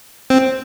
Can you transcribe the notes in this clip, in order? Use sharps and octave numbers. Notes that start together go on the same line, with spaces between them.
C4